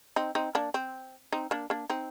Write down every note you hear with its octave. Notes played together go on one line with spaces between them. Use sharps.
C4 D#4
C4 D#4
A#3 D4
C4
C4 D#4
A#3 D4
A#3 D4
C4 D#4